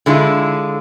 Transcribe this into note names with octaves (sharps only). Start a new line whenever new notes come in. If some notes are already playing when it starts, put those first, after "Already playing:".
D3 G#3 E4 F4